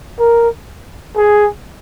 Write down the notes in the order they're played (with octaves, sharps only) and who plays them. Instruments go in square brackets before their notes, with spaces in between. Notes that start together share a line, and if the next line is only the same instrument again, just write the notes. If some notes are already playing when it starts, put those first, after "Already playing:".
[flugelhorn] A#4
G#4